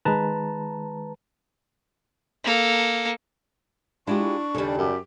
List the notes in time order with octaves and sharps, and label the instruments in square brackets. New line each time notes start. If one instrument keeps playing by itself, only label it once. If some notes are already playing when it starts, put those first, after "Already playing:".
[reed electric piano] D#3 G#3 [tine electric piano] B4 A5 A#5
[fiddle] A#3 A4
[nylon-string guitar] G#3 F4 G4 [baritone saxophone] D4 [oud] E4 [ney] C#6
[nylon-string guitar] D#2 A4 [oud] C#3 G3
[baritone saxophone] F#2 [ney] G4